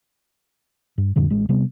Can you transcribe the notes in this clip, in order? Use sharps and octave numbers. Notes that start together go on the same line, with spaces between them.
G2
F2 A2 D3 G3
A1 G#3
C3 G3 B3